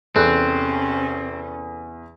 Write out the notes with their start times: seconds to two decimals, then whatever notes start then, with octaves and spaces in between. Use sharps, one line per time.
0.16 E2 C3 C4 C#4 A4 F#6